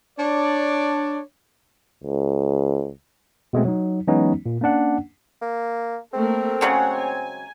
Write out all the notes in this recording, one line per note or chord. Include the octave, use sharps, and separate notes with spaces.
D4 C#5 D5
C#2
B2 G#3 A3 C4
F#3 D#4
E3 F#3 G#3 B3 C#4 D#4
A#2
A#3 C#4 D4 F#5
A#3
A3 A#3 C4 A#4
C#3 F#3 G#3 C#5 F#5
G#5